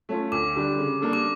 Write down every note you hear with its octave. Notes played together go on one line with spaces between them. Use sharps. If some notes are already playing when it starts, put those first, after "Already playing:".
A3 C#4 F4
D2 D6
D3 G3 D4 G4
C#3
G3 A#3 D4 A4
D6